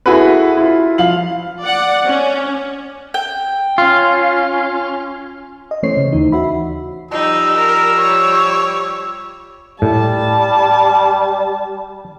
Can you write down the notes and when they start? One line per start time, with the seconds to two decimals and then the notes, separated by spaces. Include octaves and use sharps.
0.06 E4 F#4 G#4 A4 B4
0.57 E4 F4
0.98 F3 F5 F#7
1.63 D5 F#5
2.06 C#4
3.14 G5
3.78 C#4 F4
5.71 D#5
5.83 E3 A3 C#4 C5 C#5 C7
5.97 C#3
6.12 D#2 E3 D#4
6.32 F#4 E5 B5
7.11 F3 G3 D#4 E6
7.58 A#4
7.99 C#5
9.82 A2 G3 A5